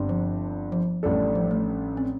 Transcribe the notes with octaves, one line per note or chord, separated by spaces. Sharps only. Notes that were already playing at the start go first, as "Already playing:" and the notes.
Already playing: G1 G2 G3 C4
F3
F3
A1 A2 G3 D4 A4
F3
A3
C4